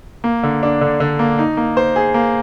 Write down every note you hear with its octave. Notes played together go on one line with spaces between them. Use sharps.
A#3
D3
D4
D3
D3
A#3
D#4
A#3
C5
G#4
A#3